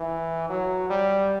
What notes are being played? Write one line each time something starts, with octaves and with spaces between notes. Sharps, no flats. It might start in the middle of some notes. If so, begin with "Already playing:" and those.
Already playing: E3
F#3
G3